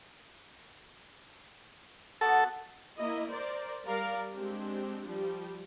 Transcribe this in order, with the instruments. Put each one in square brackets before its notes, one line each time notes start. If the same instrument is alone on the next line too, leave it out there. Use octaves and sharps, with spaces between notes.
[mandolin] B3 C4 F#4 [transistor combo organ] A4
[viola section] A#3 E4 D#5
A#4 C5 D5
G3 A#4 D5 F5
G#3 C4 D4 G4
F3 G3 G4